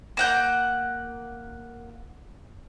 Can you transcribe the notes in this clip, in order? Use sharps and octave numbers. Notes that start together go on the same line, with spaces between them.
A#3 F#5 G6